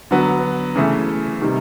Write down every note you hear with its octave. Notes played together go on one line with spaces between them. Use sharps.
D3 F#3 B3
C#3 E3 A3
C3 D#3 G3